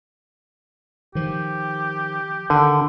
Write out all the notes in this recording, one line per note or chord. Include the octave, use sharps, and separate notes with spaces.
D#3 F3 G4
D3 D#3